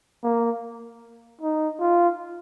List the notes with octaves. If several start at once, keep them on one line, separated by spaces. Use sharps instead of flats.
A#3
D#4
F4